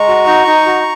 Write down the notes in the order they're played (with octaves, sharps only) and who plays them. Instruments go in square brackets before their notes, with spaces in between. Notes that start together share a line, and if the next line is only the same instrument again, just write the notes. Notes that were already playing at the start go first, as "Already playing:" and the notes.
Already playing: [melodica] G#3 A#5 C#6
F#4
D#4
D#4
F#4